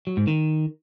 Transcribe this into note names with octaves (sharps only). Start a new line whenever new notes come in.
F#3
G#2
D#3